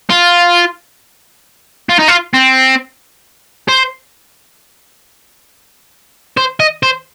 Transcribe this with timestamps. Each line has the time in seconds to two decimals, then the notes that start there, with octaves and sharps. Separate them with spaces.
0.10 F4
1.90 F4
1.99 D#4
2.08 F4
2.34 C4
3.68 C5
6.37 C5
6.60 D#5
6.83 C5